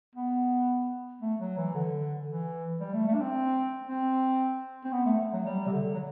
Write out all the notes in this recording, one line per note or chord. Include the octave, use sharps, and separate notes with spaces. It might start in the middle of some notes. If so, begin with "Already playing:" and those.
B3
A3
F#3
E3
D3
E3
G3
A3
A3
D4
C4
C4
C4
B3
A3
A3
F#3
G3
C3
D3
F#3